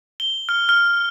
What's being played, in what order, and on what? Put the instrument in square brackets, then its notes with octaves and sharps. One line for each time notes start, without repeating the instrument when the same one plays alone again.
[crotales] G7
F6
F6